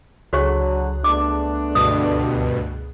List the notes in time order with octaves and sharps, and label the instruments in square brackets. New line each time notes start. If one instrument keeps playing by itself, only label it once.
[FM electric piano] C#2 G#4 F#6 [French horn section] D3 F#3 [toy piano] F#4 C#5 C#6
[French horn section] A3 B3 D4 [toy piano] D6
[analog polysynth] D2 G2 B2 [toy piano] D#6